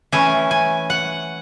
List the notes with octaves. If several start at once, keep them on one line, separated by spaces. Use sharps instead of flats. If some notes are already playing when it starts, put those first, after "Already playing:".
E3 A3 C#4 G#5
G#5
F#5